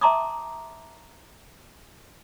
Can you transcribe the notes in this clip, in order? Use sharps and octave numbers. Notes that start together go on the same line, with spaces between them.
E5 A5 A#5 C6 D6 D#6